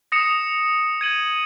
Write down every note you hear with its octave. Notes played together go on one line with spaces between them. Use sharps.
D#6 A#6 C#7 E7
G#6 D#7 F#7